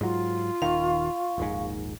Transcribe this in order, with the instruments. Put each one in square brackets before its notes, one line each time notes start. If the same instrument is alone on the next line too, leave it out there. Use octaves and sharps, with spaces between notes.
[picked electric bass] G#2 F#3 [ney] F4
[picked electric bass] D#1 D#3 [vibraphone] F5 C#6
[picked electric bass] D#1 A#1 G#2